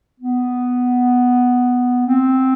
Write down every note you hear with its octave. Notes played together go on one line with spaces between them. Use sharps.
B3
C4